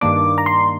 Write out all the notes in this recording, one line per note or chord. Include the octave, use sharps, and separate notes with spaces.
G2 D#3 A#3 D4 D6
A#5
C6